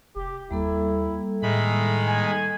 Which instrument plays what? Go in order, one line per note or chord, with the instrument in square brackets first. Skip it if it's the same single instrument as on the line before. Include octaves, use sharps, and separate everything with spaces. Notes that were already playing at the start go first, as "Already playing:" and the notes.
[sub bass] F1 [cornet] G4
[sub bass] D#2 [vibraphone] G3 A#3 A4 [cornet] E4
[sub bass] A2 [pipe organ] D#3 G#3 B5 [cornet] E5
[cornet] G#5